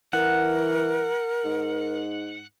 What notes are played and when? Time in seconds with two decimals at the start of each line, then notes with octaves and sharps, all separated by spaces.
0.13 E3 A#4 F#5
1.45 G#2